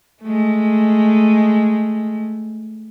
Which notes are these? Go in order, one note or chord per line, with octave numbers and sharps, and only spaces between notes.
G#3 A3